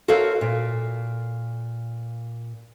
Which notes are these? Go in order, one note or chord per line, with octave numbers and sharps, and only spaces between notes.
F#4 A4 A#4 C5 C#5 F5
A#2